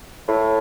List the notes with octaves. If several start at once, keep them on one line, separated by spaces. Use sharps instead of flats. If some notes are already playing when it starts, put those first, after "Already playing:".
A2